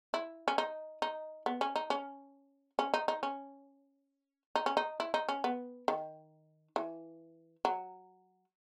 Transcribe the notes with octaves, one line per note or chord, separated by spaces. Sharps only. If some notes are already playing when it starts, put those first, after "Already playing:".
E4
C#4
D#4
D#4
B3
C#4
D#4
C#4
C#4
D#4
D#4
C#4
D#4
C#4
D#4
E4
D#4
C#4
B3
D#3
E3
F#3